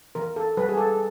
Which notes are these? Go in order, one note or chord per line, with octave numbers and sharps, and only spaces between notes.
E3 A#4
A4
G3 B4
G#4
A4